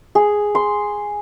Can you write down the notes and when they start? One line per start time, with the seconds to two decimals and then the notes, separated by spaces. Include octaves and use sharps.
0.15 G#4
0.55 C6